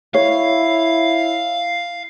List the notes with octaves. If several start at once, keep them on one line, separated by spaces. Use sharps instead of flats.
E4 C#5 F5